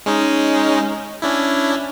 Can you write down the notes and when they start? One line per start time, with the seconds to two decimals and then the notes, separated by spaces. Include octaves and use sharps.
0.06 G#3 C#4 D#4
1.22 C#4 D4 E4